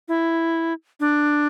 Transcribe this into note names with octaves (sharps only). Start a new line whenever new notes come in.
E4
D4